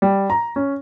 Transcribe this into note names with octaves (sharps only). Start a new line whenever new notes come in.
G3
A#5
C#4